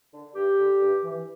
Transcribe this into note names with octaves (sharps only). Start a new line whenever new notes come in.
D3
G2 G4
D3
G2
E3